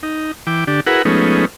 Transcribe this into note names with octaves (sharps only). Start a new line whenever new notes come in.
D#4
E3 G5 D6
D3 D4 G4
E4 F#4 G#4 A#4 B4 F#5
F3 G#3 A3 B3 C#4 D#4